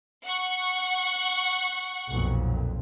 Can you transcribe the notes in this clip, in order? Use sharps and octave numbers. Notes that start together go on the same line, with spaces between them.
F#5 C#6
B1 F2 A#2